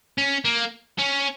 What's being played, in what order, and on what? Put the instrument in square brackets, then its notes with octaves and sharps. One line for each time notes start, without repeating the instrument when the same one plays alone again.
[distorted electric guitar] C#4
A#3
C#4